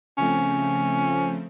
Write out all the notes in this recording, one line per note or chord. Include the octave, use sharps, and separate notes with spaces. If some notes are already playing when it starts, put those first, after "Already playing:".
C#3 F3 A3 C4 C#4